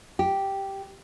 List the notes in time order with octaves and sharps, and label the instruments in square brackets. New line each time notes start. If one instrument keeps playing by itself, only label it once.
[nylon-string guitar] G4